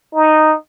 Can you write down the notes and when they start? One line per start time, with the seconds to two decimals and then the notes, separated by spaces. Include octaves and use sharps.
0.15 D#4